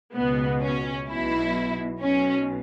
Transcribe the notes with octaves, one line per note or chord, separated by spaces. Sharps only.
C#2 B2 B3
C#4
B1 B2 E4
B1 B2 C#4